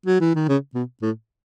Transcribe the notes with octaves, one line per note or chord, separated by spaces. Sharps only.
F#3
E3
D#3
C#3
B2
A2